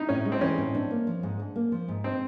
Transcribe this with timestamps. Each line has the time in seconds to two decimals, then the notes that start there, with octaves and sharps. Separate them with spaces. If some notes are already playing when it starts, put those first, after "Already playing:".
Already playing: D#4 E4
0.09 A2 C#4
0.26 G#3
0.32 C4
0.41 E3 C#4
0.58 A2
0.75 D4
0.91 A#3
1.07 F3
1.23 G#2
1.39 D4
1.56 A#3
1.72 F3
1.88 G#2
2.04 C4 D#4